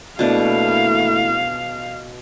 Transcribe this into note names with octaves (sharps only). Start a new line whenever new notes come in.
B2 A3 A#3 D4 E4 F5